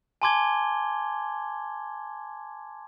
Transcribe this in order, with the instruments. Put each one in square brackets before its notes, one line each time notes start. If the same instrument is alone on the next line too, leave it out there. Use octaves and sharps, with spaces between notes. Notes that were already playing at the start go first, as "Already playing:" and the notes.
[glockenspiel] G#5 A5 C6 D6 G#6 G7